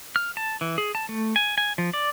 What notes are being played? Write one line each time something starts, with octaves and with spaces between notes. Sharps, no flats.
F6
A5
E3
G#4
A5
A3
G#5
G#5
F3
D5